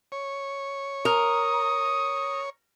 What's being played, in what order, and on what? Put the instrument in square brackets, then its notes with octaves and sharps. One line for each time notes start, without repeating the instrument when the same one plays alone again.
[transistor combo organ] C#5
[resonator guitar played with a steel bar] A#4 [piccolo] D#6